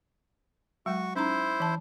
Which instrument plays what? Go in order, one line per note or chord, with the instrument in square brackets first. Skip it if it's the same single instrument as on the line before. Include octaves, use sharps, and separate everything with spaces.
[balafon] F#3 G#3 [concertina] F#4 C#6
[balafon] C#4 D#4 A#5 [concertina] E4 C5
[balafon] E3 A5